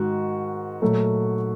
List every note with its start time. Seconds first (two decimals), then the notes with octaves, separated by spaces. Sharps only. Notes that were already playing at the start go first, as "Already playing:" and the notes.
Already playing: G#2 D#3 F#4
0.82 A#2 F#3 A3